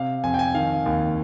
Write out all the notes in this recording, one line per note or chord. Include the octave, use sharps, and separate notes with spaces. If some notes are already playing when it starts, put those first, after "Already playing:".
Already playing: C3 F5
F2 G#5
G5
G#5
D#3 F5
D#2